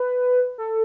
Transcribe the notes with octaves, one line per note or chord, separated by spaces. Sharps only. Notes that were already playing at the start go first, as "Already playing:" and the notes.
Already playing: B4
A4